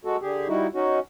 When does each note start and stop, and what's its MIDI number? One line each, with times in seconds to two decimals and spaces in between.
0.05 0.17 56
0.05 0.17 66
0.05 0.17 69
0.22 0.48 50
0.22 0.48 67
0.22 0.48 68
0.48 0.67 55
0.48 0.67 63
0.48 0.67 64
0.48 0.67 66
0.74 0.99 61
0.74 0.99 63
0.74 0.99 66